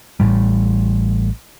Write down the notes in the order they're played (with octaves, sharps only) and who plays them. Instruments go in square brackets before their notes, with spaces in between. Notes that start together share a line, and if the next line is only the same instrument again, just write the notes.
[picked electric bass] A1 A2 G3